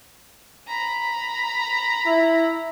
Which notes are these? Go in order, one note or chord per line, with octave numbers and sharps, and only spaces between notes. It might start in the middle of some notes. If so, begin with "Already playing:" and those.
A#5 B5
E4